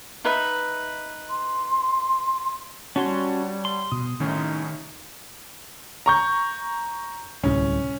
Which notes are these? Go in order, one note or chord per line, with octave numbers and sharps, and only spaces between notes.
D#4 B4 E5
C6
G3 C#4 F#4 C#5 F#5 A5 C6
C6
B2 D#6
C2 A2 D#3 C#4 D#4
A#5 C#6 G6
D1 C2 C#4